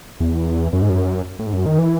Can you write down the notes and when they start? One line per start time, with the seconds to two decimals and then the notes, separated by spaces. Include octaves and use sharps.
0.20 E2
0.73 F#2
0.82 G#2
0.90 F#2
1.39 A2
1.46 G#2
1.53 F#2
1.66 D#3
1.78 E3